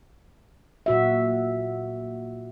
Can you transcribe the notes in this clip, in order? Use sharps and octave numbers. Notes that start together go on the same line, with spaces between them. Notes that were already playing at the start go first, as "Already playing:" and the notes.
A#2 F#4 E5